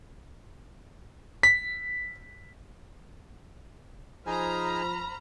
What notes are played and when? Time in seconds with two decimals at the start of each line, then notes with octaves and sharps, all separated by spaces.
1.43 B6
4.27 F3 D#4 G#4 C5 G#5 A#5 B5 F6